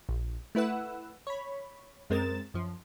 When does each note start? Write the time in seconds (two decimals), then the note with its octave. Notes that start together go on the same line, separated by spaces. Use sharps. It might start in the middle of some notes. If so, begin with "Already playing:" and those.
0.09 A#1
0.55 A3 E4 B4 F#5 E6
1.27 C#5 B5
2.10 F#2 G#3 C4 A#4 A6 E7
2.54 F#2 F3